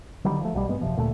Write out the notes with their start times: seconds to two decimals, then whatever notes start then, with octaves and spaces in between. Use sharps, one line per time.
0.24 D3 D#3 F#3 G3
0.40 F3 A3
0.54 B1 B2 F3 G3
0.69 G2 G#3 B3
0.81 F#1 C3 F3
0.96 D2 A#2 G3 A3